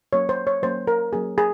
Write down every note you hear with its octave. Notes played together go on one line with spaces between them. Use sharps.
F#3 A#3 C#4 C#5
C5
C#5
F#3 A#3 C#4 C5
A#4
F#3 A#3 C#4 G#4
G#4